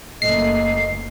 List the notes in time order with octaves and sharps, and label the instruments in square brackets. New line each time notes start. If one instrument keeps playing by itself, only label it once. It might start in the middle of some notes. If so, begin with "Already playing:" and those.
[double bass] F#1 [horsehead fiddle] A3 A#3 [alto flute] D#5 [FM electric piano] C7